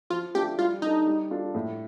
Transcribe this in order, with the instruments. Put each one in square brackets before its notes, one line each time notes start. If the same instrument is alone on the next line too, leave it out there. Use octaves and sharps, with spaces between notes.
[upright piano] F3 [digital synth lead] F4
[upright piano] A3 D4 F4 A4 [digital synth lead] G4
[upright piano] G3 [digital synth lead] F4
[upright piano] D4 A4 [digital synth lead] D#4
[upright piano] G3
D4 F4 A4
A2